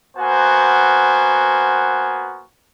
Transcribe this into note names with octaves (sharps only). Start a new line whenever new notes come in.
A#3 B3 F#4 C5 G#5